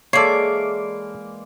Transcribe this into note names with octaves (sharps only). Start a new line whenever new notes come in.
E3 G#3 A#3 A4 C#5 D5 C7